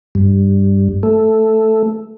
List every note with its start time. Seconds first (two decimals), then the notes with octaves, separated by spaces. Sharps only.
0.15 G2
1.03 A3